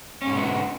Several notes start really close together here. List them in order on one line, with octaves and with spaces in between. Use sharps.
C#4 G#2 B2 B3 D3